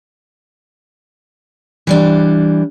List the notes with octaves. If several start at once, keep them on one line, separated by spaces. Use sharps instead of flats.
E3 G3 D4